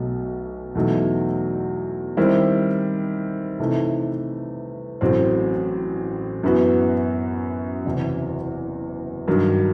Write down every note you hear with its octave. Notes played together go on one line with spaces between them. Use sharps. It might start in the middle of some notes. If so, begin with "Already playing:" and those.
Already playing: B1 B2 F#3 A3
E2 B2 F#3 A3 D#4
D#3 G3 C4 E4
C3 E3 A3 D#4
A1 A2 F#3 C4
F#2 E3 B3 F#4
F#1 E2 C3 E3
G2 D#3 F#3